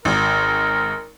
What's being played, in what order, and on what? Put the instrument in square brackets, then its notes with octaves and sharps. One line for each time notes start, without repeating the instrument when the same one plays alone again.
[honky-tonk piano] G#1 [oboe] A#4